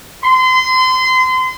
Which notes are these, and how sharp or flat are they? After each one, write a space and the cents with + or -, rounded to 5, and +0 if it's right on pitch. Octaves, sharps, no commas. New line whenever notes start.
C6 -30